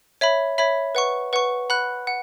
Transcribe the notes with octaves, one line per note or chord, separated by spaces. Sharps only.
C#5 E5 B5
C#5 E5 B5
B4 F#5 C#6
B4 F#5 C#6
F#5 B5 F#6
F#5